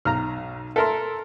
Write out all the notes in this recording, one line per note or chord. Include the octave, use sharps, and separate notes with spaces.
B1 A#5 F6
A4 A#4 E5 C6